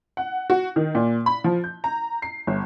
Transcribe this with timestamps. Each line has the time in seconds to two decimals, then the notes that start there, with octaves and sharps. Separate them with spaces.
0.17 F#5
0.50 F#4
0.76 D#3
0.95 A#2
1.26 B5
1.44 F3
1.64 G6
1.84 A#5
2.22 C7
2.47 G1